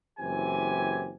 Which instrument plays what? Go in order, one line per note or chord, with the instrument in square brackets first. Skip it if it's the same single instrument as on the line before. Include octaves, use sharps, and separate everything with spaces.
[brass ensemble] F#1 F#2 E3 C4 G4 G#5